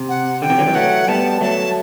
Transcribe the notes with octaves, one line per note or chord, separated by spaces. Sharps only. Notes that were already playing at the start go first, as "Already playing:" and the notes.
Already playing: C3
F#5
D3 G5
C3 E3
D3 F#3
E3 G3
F#3 A3 F#5
G3 B3 A5
F#3 A3 A5